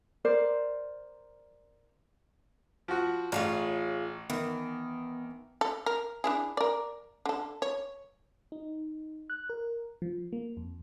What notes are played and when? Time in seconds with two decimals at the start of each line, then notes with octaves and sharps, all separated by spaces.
0.25 A#4 C5 D5
2.88 F3 F#4
3.32 A1 F4 G#4 C#5
4.30 D#3 E3 B3
5.61 A4
5.86 A#4
6.24 D4 E4 G#4
6.57 A#4 D5
7.26 D3 A4
7.62 C#5
8.52 D#4
9.30 F#6
9.50 A#4
10.02 F3
10.33 A#3
10.57 F2